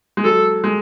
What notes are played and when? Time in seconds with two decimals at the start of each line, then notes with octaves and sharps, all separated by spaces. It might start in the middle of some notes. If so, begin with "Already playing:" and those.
0.17 G#3
0.24 F#3 A4
0.64 G#3